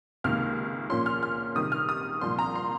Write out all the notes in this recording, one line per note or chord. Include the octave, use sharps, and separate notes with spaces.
C#2 C3 D#3 A#3 F6
A#2 F3 A#3 C#4 C6
F6
F6
C3 D#3 G3 D#6
F6
D#6
C2 A#2 F3 C6
A#5
C6